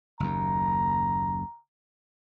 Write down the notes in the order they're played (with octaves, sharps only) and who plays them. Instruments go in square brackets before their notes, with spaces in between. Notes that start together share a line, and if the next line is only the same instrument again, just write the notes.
[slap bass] F#1 D#2 [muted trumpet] A#5